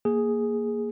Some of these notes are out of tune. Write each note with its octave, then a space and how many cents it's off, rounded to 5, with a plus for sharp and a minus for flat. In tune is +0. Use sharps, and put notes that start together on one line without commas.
A#3 +0 G#4 +0